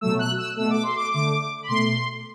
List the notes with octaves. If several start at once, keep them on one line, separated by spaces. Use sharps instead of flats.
B2 F#3 A3 E6
F#6
E6
B2 A3 E6
D6
C6
D6
D3 A3 D6
B5
B2 A3 C6